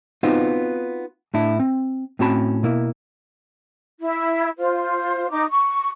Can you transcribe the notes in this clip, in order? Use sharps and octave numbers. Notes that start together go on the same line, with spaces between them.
B3 C4 D#4 F4 F#4 C5
A2 D4 E4
C4
A2 C4 C#4 F#4 A5 B5
B2 A#3 E4
E4
F4 C5
D#4 D6
C#6